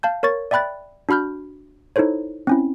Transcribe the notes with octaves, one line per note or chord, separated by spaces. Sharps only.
F5 A5 G6
A#4 C#5 C#6 A6
D5 E5 G5 B5 F#6 A6
D4 F#4 B5 F6 G6
D#4 E4 A4 C5 C#5
C4 C#4 E4